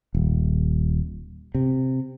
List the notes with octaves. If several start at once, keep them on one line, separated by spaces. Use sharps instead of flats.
D#1
C3